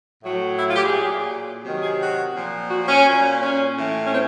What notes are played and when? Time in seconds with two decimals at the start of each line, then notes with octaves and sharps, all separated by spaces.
0.23 A2 F#3
0.59 E4
0.67 F4
0.76 G4
0.85 G#4
0.94 A#2 F#3
1.64 C3 D#3 F#3
1.82 G#4
2.00 F#4
2.35 A#2 F3
2.70 F#4
2.88 C#4
3.06 A#2 F#3
3.41 C#4
3.76 A2 E3
4.07 C#4
4.12 C4